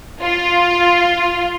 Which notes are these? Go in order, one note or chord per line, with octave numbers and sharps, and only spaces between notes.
F4